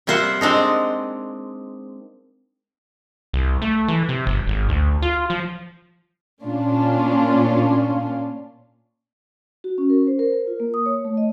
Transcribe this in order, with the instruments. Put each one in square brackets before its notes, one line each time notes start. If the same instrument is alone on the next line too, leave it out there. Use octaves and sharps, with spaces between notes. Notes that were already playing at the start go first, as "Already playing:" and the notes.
[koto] C3 G3 A#3 C5 E5 F#5
G#3 C4 D4 D#4
[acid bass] C2
A3
E3
C3
G1
G#1
D2
F4
F3
[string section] A#2 C#4 D4 F4
[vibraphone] F#4
C#4
A#4
C5
A#4
A#4
F4
A#3
D#6
C#5
A3
D#5